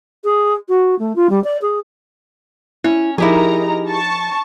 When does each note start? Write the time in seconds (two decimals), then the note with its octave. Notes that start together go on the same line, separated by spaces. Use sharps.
0.24 G#4
0.69 F#4
0.99 A3
1.16 F4
1.30 G3
1.44 D5
1.62 G#4
2.84 C#4 E4
3.18 F3 D#4 E4 G4 G#4 A#4 A#5
3.89 A5 C#6